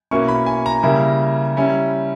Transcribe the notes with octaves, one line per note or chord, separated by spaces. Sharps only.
B2 A#3 C#4 E4 C#6
B5
G#5
A#5
C#3 G3 A#3 E4
G3 C#4 E4